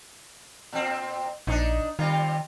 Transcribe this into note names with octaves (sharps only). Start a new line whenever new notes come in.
A#2 C4
A#1 D4 D#4
C3 D#3 G3 F4